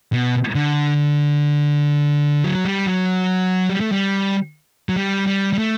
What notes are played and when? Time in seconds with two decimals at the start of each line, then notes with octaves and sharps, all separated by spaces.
0.13 B2
0.55 D3
2.44 F#3
2.65 G3
2.86 F#3
3.70 G3
3.80 A3
3.92 G3
4.89 F#3
4.96 G3
5.27 G3
5.53 G3
5.58 A3